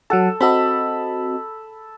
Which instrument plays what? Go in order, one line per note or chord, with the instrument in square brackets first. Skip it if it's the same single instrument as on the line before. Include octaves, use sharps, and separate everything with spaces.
[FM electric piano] F#3 F#5 A5 [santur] A4
[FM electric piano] C4 F#4 D#5 [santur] A4 B5